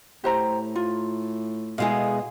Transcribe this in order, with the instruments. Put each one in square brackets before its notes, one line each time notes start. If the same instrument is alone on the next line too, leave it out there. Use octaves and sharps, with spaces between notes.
[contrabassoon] A2 [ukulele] G4 C5 A#5
[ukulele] F4
[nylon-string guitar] B2 G#3 G#4 [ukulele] E4 F5